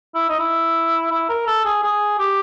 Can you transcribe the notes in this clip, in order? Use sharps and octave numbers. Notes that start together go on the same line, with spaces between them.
E4
D#4
E4
E4
A#4
A4
G#4
G#4
G4